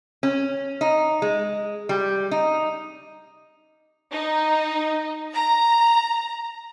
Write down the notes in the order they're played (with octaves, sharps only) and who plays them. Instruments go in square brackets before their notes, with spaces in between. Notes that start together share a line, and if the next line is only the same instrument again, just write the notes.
[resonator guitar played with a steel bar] C#4
D#4
G#3
G3
D#4
[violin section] D#4
A#5